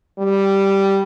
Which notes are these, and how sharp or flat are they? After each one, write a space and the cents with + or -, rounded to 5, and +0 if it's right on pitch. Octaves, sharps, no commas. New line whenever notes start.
G3 -5